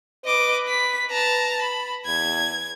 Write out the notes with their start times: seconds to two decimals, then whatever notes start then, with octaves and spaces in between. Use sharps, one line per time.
0.25 B4 D#5 D6
0.68 B6
1.11 A5 A#5
1.62 B5
2.06 E2 G#6